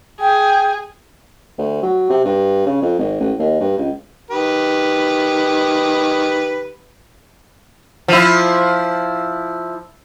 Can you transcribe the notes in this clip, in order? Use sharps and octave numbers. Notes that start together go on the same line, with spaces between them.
G#4 G5
D2
F#3
C3
G2
C#3
F2
G#1
A1
D#2
G2
C#2
D#3 G4 B4
F3 E4